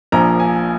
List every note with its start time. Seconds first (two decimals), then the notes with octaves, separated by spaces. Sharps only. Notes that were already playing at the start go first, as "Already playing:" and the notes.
0.12 A#1 A#2 F3 A#5
0.40 G#5